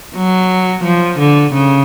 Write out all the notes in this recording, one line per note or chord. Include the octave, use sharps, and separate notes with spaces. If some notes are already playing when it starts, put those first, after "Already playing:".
F#3
F3
D3
C#3